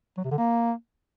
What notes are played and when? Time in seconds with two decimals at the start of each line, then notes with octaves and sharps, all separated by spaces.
0.17 F#3
0.24 C3
0.31 D3
0.38 A#3